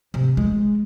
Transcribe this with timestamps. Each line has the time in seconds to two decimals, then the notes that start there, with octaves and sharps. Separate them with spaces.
0.14 C3
0.37 G#3